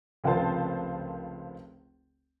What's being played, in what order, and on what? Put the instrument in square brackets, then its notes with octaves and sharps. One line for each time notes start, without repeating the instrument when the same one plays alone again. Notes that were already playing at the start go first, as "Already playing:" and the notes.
[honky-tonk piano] F1 C#2 F4 A#4 C5 A5